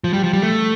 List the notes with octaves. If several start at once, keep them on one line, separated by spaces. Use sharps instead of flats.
F3
G3
F3
G3
A3